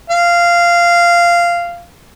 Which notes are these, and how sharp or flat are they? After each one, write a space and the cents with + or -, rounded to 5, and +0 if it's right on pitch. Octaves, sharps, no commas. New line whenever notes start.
F5 -10